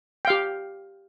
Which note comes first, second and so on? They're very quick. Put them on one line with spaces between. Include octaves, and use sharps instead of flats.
G5 F5 G4